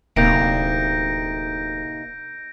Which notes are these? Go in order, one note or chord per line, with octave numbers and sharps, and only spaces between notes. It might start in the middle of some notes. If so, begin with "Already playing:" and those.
D1 C3 A#3 D#4 G6 A#6 D7